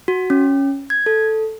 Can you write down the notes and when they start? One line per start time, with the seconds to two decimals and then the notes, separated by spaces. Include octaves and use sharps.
0.08 F#4
0.30 C#4
0.90 G#6
1.06 A4